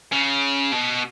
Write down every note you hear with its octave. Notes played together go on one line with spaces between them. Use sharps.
C#3
B2